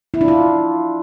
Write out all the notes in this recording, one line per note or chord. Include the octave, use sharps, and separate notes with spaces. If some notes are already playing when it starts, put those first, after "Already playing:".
E4
D4
F4